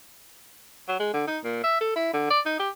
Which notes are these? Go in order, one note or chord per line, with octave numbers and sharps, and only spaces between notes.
F#3
G#3
D3
D#4
A#2
E5
A4
E4
D3
D5
D#4
G4